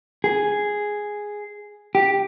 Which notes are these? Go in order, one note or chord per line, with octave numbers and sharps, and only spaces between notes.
G#4
G4